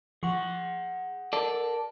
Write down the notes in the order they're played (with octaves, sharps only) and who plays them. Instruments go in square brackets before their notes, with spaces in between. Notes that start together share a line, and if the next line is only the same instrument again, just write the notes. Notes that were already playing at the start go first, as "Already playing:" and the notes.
[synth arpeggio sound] F3 C#6 [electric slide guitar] G#4 F#5
[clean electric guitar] A4 D5 [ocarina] A#4